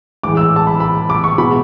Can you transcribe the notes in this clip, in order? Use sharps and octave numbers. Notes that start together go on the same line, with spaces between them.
A2 E3 G#3 D6
E6
A5
B5
B5
D6
C#6
B2 G#3 B5